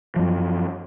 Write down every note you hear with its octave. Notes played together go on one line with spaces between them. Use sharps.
F#2 F3